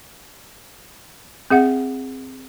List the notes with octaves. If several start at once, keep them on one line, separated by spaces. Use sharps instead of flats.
C4 G#4 E5 F#5